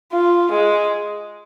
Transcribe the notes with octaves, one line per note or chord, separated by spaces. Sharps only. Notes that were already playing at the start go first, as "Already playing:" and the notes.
F4
G#3